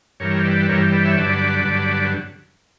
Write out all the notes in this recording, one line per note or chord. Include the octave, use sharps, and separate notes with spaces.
G2 E3 G3 A#4 C#5
B4 D5
G2 E3 G3 A#4 C#5
B4 D5
C#5 E5
G2 D3 F#3 B4 D5
G2 D3 F#3